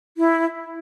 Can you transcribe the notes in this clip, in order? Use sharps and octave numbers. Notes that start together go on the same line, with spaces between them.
E4